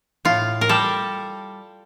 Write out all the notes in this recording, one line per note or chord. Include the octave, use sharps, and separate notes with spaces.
A2 F4
A#4
G3 A4